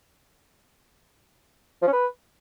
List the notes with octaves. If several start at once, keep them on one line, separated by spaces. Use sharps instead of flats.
F3
C#4
B4